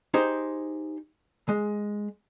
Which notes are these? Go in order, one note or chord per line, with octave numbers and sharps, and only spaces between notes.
D#4 G4 G#4 C5
G#3